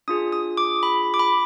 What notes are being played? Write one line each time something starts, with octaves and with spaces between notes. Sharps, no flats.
D4 F4 G#4 D#6
D#6
D6
B5
D6
B5